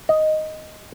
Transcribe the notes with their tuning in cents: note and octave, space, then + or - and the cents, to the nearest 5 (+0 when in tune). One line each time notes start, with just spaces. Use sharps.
D#5 +0